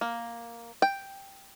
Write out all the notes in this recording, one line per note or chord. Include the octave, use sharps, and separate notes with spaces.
A#3
G5